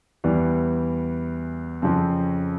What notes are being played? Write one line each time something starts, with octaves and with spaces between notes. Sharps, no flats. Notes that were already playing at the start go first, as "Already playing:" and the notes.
E2 E3 G3
F2 C#3 F3 C4